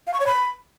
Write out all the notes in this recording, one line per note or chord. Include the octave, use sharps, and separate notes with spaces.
F5
C#6
C#5
B5